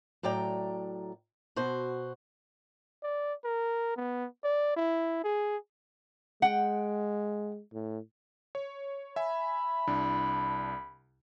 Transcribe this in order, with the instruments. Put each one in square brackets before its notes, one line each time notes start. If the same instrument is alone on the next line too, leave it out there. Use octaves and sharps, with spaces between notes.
[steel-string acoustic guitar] A2 F#3 D5 G5 A#5
B2 F#4 C5
[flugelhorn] D5
A#4
B3
D5
E4
G#4
[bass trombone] G#3 [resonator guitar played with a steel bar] F#5 G5
[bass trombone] A2
[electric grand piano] C#5
[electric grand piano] E5 G#5 [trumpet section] B5
[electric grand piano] C2 D4 E4